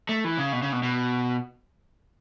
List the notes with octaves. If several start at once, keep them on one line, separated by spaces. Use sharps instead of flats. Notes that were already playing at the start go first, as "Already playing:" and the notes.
A3
E3
C#3
B2
C#3
B2
B2